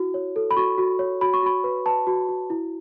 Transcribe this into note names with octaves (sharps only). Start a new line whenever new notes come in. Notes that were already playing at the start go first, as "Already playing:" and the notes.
Already playing: E4 F#4
C#5
A4
B5
F#4 C#6
F#4
C#5
F#4 B5
C#6
F#4 B5
B4
B4 A5
F#4
F#4
E4